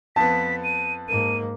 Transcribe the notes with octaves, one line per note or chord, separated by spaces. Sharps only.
F2 B3 A5 B6
D#7
G#2 A#3 D#7